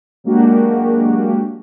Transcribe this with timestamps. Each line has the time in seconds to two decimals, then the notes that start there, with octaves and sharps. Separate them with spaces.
0.24 F#3 G#3 A#3 D4 F#4 G4